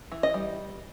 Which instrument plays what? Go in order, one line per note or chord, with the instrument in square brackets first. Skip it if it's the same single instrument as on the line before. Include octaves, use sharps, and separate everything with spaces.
[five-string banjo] E3
D#5
G3